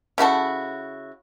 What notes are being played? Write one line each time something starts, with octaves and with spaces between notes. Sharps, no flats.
C#3 E4 F#4 A4